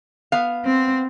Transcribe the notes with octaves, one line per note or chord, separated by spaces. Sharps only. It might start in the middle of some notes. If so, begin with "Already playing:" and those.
B3 F5
C4